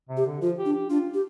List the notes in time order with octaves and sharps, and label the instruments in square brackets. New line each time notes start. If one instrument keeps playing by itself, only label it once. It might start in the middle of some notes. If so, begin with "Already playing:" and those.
[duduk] C3
[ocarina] G4
[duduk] D3
[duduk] F3 [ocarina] F4
[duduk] G4
[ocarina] D4
[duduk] G4
[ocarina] D4 [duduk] F4
[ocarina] G4